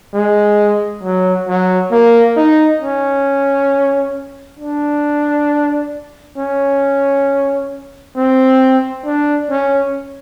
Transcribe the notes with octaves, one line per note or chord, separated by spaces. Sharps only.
G#3
F#3
F#3
A#3
D#4
C#4
D4
C#4
C4
D4
C#4